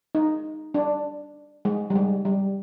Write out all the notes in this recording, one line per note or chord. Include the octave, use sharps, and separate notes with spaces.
D#4
D4
G#3
G3
G#3
G3